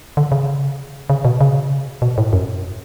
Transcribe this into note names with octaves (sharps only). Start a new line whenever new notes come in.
D3
C#3
C#3
B2
C#3
B2
A2
F#2